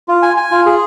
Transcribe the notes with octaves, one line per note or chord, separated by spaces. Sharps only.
F4
G#5
G#5
F4
G#4